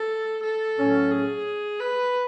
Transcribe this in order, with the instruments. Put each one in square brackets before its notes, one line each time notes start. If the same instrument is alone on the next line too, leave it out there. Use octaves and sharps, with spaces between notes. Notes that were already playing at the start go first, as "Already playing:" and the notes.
Already playing: [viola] A4
A4
[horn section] A2 F#3 C#4
[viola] G#4
B4